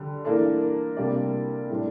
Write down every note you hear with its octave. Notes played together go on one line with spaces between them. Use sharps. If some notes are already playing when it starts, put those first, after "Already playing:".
Already playing: D3 G3
E3 A#3 D4 A4
A#4
C3 G3 A#3 D4 D5
A2 G3 D4